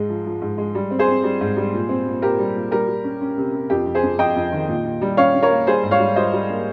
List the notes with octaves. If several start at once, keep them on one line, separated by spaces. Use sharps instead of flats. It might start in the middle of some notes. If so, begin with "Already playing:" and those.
Already playing: G#2 G#3
F3
F3
G#2
G#3
G3
C4
G#4 C5
C4
G3
G#2
G3
A#2
C4
A#2
A#2 G4 A#4
G3
A#2
G3 G4 A#4
G3
C#4
C#4
C3
C3
F2 G4
F2
G#4 C5
F2
F2 D#5 G5
F2
D#3
A#2
A#2
G3
C#4 C#5 F5
C#4
A#4 C#5
A#3
G3 G#4 C5
G#2
C#5 F5
G3
G3 C5 D#5
G3
A#3